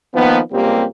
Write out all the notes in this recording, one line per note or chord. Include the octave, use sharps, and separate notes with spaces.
D#3 F3 A#3 B3
C#2 G3 A#3 C4 G4